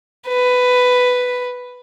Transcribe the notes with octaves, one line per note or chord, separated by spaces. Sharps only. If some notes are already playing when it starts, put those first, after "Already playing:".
B4